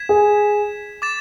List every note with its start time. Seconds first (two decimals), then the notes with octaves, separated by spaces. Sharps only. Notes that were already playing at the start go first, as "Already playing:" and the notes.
Already playing: G#6 B6 E7
0.09 G#4
1.02 D6 A6 E7